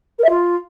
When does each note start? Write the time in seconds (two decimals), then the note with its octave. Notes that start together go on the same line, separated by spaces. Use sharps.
0.19 A#4
0.24 E5
0.29 F4